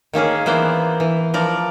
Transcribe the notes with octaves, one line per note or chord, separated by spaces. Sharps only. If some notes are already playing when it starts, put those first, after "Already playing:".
D#3 A#3 C#4 G#4
E3 A#3 B3 C5 D5
E3
F3 A#4 D5